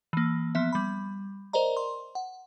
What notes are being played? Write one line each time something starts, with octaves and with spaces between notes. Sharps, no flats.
E3 A#3
F3 B3 E5
G3 B5
A#4 C5 D5 D#5 A#5
C6
F#5